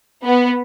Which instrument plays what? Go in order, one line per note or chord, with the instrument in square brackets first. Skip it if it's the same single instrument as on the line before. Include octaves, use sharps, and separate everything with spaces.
[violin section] B3